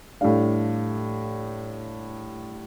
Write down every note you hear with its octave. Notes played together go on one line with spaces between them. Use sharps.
A2 G3 D4 F5